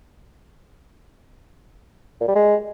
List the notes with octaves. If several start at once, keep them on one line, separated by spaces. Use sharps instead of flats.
A#2
G3
G#3